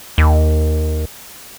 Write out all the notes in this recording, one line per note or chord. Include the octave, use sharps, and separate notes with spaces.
D#2